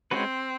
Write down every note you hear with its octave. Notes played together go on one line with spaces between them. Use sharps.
G#3 C4 C#4 F#4 B4